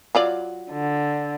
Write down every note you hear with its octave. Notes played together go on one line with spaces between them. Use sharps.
F#3 F4 D5
D3